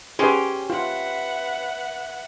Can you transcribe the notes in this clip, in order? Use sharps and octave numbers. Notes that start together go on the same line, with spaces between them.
C#4 G4 G#4 B4 C5
F4 B4 E5 F#5